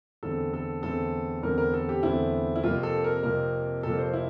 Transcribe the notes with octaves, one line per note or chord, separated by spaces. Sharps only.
E2 D3 A3 C4 A4
A4
E2 D3 A3 C4 A4
E2 D3 A3 C4 A#4
A#4
A4
G4
E2 D3 A3 C4 E4
E4
F2 C3 F3 A#3 F4
A4
A#4
F2 C3 F3 A#3 A#4
F2 C3 F3 A#3 A4
C5
E4